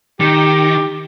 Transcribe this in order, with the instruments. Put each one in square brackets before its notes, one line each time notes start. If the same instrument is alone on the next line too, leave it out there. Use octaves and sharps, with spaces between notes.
[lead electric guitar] D#3 [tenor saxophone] G4